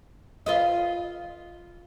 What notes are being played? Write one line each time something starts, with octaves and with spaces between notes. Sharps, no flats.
F4 B4 D#5